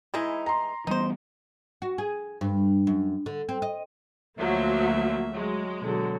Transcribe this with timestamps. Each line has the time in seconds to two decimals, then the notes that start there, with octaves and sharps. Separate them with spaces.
0.14 E3 G#3 D#4 E4
0.46 A#5 C6
0.87 E3 G3 B3 D#4 C5
1.82 F#4
1.98 G#4
2.41 G2
2.87 F#2
3.26 D3
3.49 C4
3.62 D#5
4.39 D2 F3 F#3 A#3 E5
5.35 F#3 G#3
5.81 B2 D3 F#3